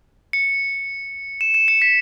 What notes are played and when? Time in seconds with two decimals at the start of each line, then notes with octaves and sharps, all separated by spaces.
0.33 C#7
1.41 E7
1.54 E7
1.68 C#7
1.82 B6